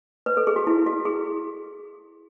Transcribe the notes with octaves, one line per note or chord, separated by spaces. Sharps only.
B4
A4
G#4
F#4
E4
F#4
G#4